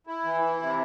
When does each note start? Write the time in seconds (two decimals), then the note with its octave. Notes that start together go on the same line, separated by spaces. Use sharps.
0.07 E4
0.24 E3
0.41 E4
0.59 C3